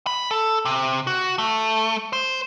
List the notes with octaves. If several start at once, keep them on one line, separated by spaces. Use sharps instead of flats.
B5
A4
C3
F#4
A3
C5